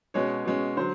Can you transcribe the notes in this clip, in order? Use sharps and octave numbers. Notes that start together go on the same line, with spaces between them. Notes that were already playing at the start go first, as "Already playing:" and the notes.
B2 G#3 C#4 C#5
B2 G#3 C#4
D3 F#3 C5